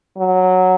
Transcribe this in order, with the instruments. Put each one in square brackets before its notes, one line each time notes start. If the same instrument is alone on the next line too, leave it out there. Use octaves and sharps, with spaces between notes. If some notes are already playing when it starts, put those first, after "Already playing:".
[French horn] F#3